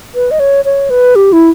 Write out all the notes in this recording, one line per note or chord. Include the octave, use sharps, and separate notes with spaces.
B4
D#5
C#5
C#5
B4
G4
E4